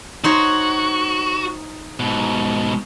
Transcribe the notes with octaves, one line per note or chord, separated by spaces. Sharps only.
D#4 F#4 C5 C#5
G#2 B2